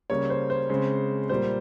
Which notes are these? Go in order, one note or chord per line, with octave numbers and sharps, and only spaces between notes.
C#3 G3 A#3 C#5
C5
C5
C#3 G#3 C4
A#2 G3 A#3 C5